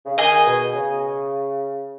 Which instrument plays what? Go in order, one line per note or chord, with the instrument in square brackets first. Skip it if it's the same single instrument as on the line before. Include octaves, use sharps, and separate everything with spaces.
[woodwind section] C#3
[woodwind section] D#3 [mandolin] G#4 D#5 G#5
[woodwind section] B2
C#3